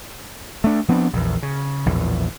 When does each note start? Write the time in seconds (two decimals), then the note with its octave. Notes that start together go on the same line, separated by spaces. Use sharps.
0.64 A3 D4
0.88 F3 B3 C4 D4
1.13 A#1 E2
1.43 C#3
1.86 A#1 E2 A2